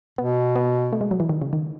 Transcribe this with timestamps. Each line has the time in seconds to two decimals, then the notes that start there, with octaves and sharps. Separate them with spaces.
0.18 B2 B3
0.56 B3
0.93 A3
1.01 G#3
1.11 F#3
1.20 E3
1.29 D#3
1.42 C#3
1.53 D#3